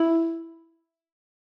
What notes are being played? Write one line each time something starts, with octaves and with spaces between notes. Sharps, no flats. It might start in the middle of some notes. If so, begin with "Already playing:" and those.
Already playing: E4